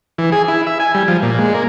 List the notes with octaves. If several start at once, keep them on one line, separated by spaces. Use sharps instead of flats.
E3
G#4
E4
E5
G#5
G3
F3
A#2
G#3
A#3